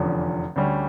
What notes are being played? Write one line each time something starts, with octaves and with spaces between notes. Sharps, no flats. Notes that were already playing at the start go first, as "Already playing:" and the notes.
Already playing: F1 E2 D3 F3 C#4
D2 D3 G3 C#4